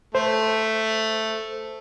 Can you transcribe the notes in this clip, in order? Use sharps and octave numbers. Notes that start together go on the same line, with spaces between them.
A3 C5